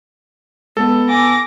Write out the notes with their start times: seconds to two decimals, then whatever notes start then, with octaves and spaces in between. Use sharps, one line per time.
0.77 G#3 B3 A4
1.09 G#5 D6 A#6